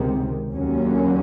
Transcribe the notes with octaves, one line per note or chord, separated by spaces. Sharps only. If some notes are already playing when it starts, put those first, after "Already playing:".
Already playing: C#2 C3 D#3
D#2 D3 F#3 A#3 C#4